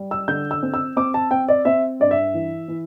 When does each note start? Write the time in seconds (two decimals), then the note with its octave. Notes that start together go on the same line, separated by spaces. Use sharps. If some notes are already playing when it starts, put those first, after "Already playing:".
Already playing: G3
0.11 E6
0.28 D3 G6
0.51 E6
0.63 C4
0.74 E6
0.97 C4 D6
1.14 A5
1.31 C4 G5
1.48 D5
1.65 C4 E5
2.00 G2 D5
2.11 E5
2.34 E3
2.68 E3